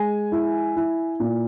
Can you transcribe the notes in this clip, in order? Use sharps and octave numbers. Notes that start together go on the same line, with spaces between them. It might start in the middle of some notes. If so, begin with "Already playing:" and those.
Already playing: G#3 G#5
E4
E4
A#2